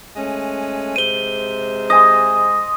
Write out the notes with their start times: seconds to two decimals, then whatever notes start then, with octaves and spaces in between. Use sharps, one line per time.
0.16 G#3 A3 C#4
0.96 C3 G#3 C5 D#7 G7
1.90 D#5 G#5 C6 D#6